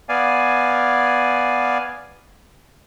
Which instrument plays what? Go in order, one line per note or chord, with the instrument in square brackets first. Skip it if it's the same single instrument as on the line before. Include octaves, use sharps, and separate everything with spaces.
[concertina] B3 D5 F5 G#5